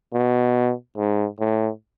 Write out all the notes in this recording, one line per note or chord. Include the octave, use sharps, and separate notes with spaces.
B2
G#2
A2